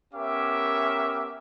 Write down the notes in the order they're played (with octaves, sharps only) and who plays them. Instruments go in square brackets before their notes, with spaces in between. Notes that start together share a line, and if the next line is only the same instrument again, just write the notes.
[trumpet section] B3 C#4 G4 A#4 E5 D6